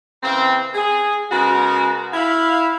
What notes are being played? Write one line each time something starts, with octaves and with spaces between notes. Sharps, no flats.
C#3 E3 A#3 C4
G#4
C#3 G#3 B3 F#4 A#4
E4 F5 B5